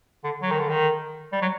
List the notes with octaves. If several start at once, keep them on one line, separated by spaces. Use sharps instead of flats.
D3
F#3
D#3
D3
D#3
G3
F#3